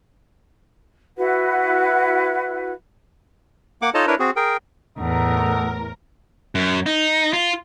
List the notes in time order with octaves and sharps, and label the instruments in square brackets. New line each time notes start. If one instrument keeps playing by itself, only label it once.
[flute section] E4 F#4 B4 F#5
[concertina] A#3 F#5 D6
D#4 F4 A4 C#5 D#5 A5
D4 E4 A#4 B4 C#5
C4 F#4 G#4
G#4 A#4 G5
[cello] E2 [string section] A2 A#4 [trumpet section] D#4 A4 F#5
[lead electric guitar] F#2
D#4
F4